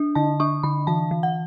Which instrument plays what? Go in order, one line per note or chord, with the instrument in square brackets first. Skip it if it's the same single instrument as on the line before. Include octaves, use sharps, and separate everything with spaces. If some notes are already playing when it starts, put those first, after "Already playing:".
Already playing: [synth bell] D4
D3 A5
D4 C#6
D3 B5
E3 A5
E3
F#5